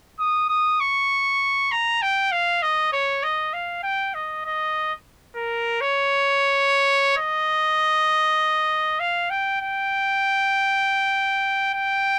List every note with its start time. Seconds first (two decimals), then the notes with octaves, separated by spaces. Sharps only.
0.19 D#6
0.49 D#6
0.80 C#6
1.72 A#5
2.02 G5
2.32 F5
2.62 D#5
2.92 C#5
3.23 D#5
3.53 F5
3.83 G5
4.14 D#5
4.45 D#5
5.35 A#4
5.81 C#5
7.17 D#5
9.00 F5
9.30 G5
9.61 G5
11.74 G5